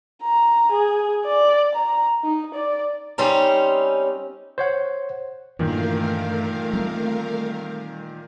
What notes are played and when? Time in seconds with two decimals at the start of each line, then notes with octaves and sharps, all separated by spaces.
0.23 A#5
0.72 G#4
1.25 D5
1.74 A#5
2.24 D#4
2.54 D5
3.18 G3 C4 C#4 D#4
4.58 C5 C#5 F#5
5.59 G2 A#2 D#3 E3 A3 A#4 F5
6.73 G3 C4